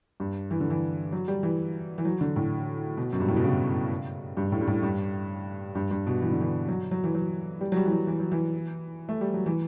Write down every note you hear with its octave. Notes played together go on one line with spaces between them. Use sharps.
G2
E3
D3
E3
F#3
G3
E3
E3
F#3
D3
A2
B2
F#2
G2
A2
B2
C#3
G2
A2
G2
A2
G2
G2
G2
B2
E3
D3
E3
F#3
F#3
E3
F#3
G3
F#3
G3
E3
F#3
E3
F#3
E3
A3
G3
F#3
E3